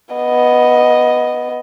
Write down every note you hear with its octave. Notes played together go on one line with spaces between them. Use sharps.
B3 D#5